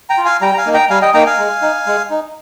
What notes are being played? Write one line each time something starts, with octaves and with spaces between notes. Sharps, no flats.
G5 A#5
F4
F5 G#5
G3 G5 A#5
A#5
F5 G#5
A#3 D#4
G5 A#5
G3 F5 G#5
D#5 G5
A#3 D#4 G5 A#5
F5 G#5
G#3
D#4
G#3
D#4